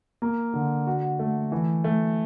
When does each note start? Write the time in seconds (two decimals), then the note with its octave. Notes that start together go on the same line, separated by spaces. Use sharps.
0.22 A#3
0.54 D3
0.87 F#4
1.19 A3
1.52 E3
1.84 A3